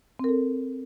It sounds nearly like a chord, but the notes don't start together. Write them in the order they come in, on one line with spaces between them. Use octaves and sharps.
C4 A#4 A4